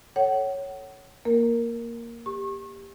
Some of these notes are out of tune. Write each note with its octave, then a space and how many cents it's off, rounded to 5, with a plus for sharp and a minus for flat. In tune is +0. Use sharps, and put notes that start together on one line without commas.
A4 +5 C#5 +0 F#5 +30
A#3 +0 A#4 +0
G4 +15 C#6 -35